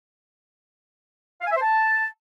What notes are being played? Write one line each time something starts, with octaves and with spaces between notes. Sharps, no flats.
F5
G#5
E5
C5
A5